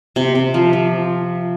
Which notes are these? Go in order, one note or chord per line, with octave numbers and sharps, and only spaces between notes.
C3
C3
F3
F3